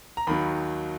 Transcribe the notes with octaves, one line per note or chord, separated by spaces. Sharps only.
A#5
D#2 D#3 F#3 B5